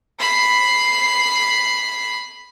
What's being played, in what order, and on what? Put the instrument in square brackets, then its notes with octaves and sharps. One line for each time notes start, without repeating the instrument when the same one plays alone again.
[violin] B5 C7